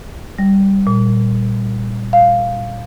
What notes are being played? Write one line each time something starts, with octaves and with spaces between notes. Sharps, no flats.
G3
A#2
F5